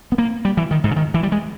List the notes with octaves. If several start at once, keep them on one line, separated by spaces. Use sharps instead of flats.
B3
A#3
G3
E3
D#3
G#2
C#3
D#3
E3
G3
G#3